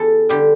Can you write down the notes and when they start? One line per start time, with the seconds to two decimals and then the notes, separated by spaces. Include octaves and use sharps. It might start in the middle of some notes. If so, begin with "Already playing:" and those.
Already playing: E2 G4 A4
0.29 D3 G3 G4